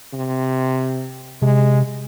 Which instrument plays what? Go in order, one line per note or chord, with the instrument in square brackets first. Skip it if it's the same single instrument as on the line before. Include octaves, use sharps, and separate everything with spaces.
[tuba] C3
[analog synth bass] C3 [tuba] G#3